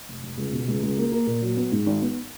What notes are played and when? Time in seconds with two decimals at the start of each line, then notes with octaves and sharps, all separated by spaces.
0.09 F1
0.24 F1
0.38 C#2
0.53 B2
0.68 C#2
0.83 C#2
0.98 A#3
1.12 A#3
1.27 A#2
1.42 F#3
1.57 B3
1.72 G#2
1.86 G#1
2.02 B3